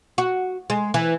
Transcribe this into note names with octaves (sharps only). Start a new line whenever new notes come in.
F#4
G#3
E3